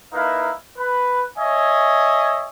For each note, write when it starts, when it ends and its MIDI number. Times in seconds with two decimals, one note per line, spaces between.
0.13 0.53 58
0.13 0.53 63
0.13 0.53 64
0.13 0.53 71
0.13 0.53 77
0.77 1.25 71
1.38 2.48 73
1.38 2.48 75
1.38 2.48 76
1.38 2.48 80